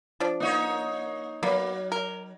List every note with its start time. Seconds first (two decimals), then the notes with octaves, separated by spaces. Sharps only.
0.20 F3 D4
0.40 A#3 D#4 C#5
1.43 F#3 A#3 B3
1.92 A#4